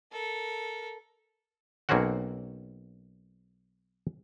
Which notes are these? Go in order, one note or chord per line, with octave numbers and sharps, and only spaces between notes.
A4 A#4
B1 A#3 C4 C#4 F#4 F#5